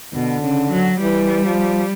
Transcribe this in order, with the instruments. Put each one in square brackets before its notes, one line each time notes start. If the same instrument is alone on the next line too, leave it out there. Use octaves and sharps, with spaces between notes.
[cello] B2 [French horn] D3
[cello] C#3
F#3
[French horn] E3 [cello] G3
[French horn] F3